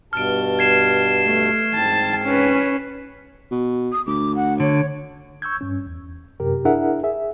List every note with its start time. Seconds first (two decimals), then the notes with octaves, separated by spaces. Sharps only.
0.13 G2 B2 A5 F6 D7
0.59 G#6 C7 E7
1.24 A3
1.75 G#2 C4 A5
2.25 C#4 B4
3.51 B2
3.92 D#6
4.07 D2 D6
4.36 F#5
4.60 D3 C#5
5.42 C#6 E6 G6 G#6
5.61 G2 C#4
5.86 E2
6.40 F#2 C3 G4 A#4
6.65 D4 E4 G#4 A#4 E5 F#5
7.03 G#4 E5